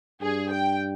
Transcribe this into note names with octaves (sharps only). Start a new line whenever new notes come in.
G2 G#4
G5